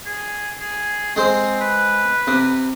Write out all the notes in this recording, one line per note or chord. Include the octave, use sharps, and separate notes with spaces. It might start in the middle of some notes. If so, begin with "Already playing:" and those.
G#4
G#4
G#3 C4 G#4 C5
B4
C3